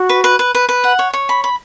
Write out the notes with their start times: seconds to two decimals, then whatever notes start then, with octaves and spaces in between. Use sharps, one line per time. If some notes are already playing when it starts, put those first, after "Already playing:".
Already playing: F#4
0.09 B4
0.24 B4
0.39 B4
0.55 B4
0.69 B4
0.84 F#5
0.99 C#5
1.13 C#5
1.29 B5
1.44 B5